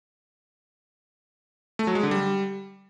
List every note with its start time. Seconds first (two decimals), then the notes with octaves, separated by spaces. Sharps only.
1.79 A3
1.87 F#3
1.95 G#3
2.03 D3
2.11 G3